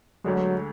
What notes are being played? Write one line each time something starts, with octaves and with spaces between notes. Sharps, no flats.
D2 D3 F#3 G#3